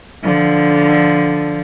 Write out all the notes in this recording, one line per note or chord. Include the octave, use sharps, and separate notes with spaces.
D3 F3